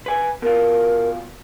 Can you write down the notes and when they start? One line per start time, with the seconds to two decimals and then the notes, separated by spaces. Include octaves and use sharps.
0.06 B4 G#5
0.42 B2 F4 A#4